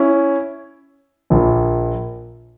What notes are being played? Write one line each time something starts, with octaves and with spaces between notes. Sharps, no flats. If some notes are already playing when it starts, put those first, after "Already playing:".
Already playing: C#4 E4
A#1 A#2